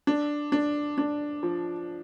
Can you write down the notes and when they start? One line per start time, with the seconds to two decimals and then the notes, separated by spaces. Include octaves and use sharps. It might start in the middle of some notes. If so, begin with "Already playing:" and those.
0.07 D4
0.52 D4
0.98 D4
1.43 F3